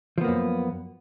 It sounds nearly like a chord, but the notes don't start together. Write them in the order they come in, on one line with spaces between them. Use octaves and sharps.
F3 B3 A#3 F#2